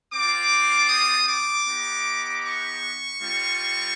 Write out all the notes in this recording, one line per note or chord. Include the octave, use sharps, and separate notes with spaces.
C4 F4 D6
D#6
D6
B3 D#4 G4
C#6
G3 C4 F4